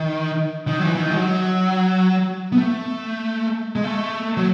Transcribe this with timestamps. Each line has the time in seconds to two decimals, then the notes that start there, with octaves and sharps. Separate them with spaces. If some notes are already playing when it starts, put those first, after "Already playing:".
Already playing: D#3
0.68 D#3
0.79 F#3
0.84 E3
0.95 E3
1.00 D#3
1.11 G#3
1.16 F#3
2.52 B3
2.57 A3
3.76 G#3
3.84 A3
4.37 F#3